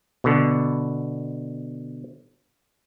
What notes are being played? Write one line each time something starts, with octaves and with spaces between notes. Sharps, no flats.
B2 D3